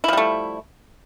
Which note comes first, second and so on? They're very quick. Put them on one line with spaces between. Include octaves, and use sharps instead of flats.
E4 F3 G3 A3